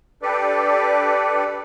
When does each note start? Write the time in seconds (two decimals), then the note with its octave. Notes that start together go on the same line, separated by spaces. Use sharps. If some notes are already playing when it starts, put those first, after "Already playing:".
0.22 D4 G4 A4 B4 D5